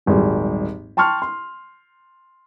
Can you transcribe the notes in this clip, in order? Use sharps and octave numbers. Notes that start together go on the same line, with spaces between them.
D#1 G#1 F#3 G3 G#4
G5 A5 C6 C#6 F6
C6